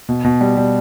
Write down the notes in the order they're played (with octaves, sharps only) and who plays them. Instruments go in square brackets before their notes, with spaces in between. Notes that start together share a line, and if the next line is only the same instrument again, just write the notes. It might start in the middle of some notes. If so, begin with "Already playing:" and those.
[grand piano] B2
B2
G3
G3